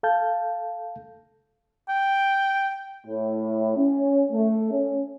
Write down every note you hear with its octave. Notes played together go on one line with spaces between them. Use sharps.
A4 F5 A5 G6
G5
A2
C#4
A3
C#4